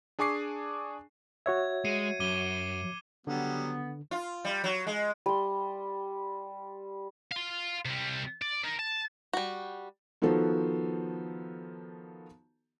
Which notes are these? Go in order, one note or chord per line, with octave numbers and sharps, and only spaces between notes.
D4 G#4 G#5 C#6 D6 C7
F#4 C#5 E5 G#6
G#3 C7 C#7 D#7
F#2 D6 D#7 G7
D3 F#3 G3 B3
F4
G3
F#3
G#3
G3 C6
F5 C6
C3 G3
D5
A#4 D#5
A5
G3 F#4
D#3 F3 B3 F#4 A4 C5